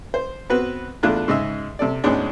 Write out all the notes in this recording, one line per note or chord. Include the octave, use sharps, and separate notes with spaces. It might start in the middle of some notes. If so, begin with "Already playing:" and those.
C5
B3 C4 F#4 B4
E2 A3 D4 F4 F#6
G#2 C#3 D#5 E5 E6
C3 A4 D5
D2 G#2 G#3 B3 C#4 D4